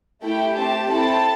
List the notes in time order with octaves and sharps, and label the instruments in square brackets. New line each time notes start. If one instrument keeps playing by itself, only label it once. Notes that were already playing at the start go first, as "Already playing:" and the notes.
[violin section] A3 E4 G4 G5
A3 C4 G4 A5
C4 E4 A4 A5